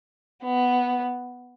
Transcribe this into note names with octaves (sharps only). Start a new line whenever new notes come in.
B3